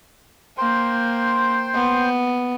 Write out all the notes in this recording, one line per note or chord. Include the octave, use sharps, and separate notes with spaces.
A#3 C5 G5 C6
B3